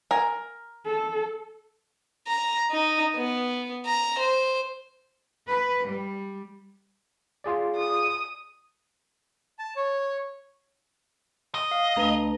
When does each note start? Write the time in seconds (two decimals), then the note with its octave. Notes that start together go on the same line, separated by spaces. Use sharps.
0.11 A#4 G#5
0.86 A4
2.27 A#5
2.71 D#4
3.16 B3
3.86 A#5
4.19 C5
5.47 B4
5.86 G3
7.44 F4 G#4 D5
7.77 D#6
9.59 A5
9.76 C#5
11.55 D#5
11.71 F5
11.96 C#2 A3 D4 B4 A#5 A#6